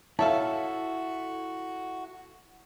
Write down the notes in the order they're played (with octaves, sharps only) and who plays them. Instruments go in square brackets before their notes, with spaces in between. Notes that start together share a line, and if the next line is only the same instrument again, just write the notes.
[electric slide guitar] E4 A4 [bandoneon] F#4 [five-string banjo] C#5 E5 F5 [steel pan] A5